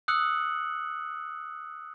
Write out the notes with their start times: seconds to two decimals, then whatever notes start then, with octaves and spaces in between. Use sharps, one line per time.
0.08 D#6 E6 F#6 C#7 F#7